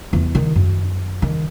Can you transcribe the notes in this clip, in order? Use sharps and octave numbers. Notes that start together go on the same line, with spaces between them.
E2 F4
D#3
F#2
D#3